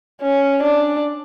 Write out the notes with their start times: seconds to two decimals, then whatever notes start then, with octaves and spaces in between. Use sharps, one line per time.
0.22 C#4
0.63 D4